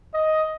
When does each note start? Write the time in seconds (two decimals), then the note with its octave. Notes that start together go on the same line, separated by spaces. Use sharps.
0.14 D#5